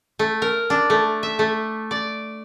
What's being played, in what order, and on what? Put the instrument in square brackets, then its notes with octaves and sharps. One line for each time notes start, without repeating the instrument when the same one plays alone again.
[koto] A3
A#4
D4
A3
E5
A3
D5